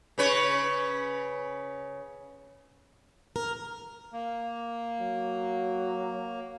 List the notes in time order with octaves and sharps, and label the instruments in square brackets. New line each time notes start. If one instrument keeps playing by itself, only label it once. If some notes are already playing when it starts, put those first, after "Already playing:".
[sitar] C#3 B4 C#5
[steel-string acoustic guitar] A#4
[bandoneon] A#3
[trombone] F#3